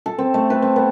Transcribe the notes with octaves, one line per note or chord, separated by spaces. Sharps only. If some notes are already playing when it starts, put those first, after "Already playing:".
A4
C4
A3
B4
C4
B3